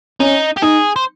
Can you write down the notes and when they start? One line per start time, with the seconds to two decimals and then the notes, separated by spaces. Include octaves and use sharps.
0.20 C#4 D#4
0.57 G4
0.62 D#4 G#4
0.96 C5